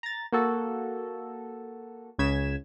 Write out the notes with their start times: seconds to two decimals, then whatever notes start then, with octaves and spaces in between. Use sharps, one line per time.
0.03 A#5 A6
0.32 A#3 F#4 A4
2.19 C#2 C#3 G#6 B6 E7